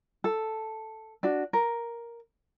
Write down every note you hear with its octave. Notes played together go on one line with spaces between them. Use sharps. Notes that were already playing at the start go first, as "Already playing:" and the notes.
A4
D4 F#4
A#4